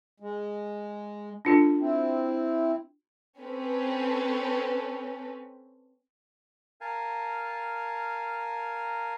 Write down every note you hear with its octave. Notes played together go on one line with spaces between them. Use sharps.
G#3
D4 F4 A4
C4 E4
C4 C#4 A4 B4
A#4 F5 G#5 A5